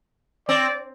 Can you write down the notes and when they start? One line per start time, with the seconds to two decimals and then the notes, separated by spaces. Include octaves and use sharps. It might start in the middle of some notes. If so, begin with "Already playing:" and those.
0.48 C4 D5